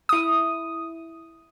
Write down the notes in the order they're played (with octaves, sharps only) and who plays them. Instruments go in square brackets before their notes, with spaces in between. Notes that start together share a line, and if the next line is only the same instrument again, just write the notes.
[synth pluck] E4 D#6